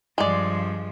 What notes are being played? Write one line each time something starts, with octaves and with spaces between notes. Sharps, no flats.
G2 F3 G#3 D5